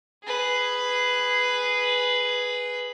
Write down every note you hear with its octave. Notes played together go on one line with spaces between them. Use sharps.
G#4 B4